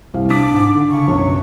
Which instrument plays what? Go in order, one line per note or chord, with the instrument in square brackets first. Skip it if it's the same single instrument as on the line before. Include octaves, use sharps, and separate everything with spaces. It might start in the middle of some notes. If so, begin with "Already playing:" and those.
[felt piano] C2 F5
[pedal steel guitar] D4 D#6 [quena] D6 [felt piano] B6
[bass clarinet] G#2
D3
[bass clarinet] C#3 [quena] C#6
[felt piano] B1 F#2 [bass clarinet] F#3